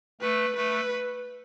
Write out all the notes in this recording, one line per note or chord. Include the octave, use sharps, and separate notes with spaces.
A3 B4
A3 B4